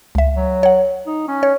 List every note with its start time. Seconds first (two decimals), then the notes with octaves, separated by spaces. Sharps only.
0.15 C#2 E5
0.36 F#3
0.63 C#5 F#5
1.07 D#4
1.28 C#4
1.43 C#5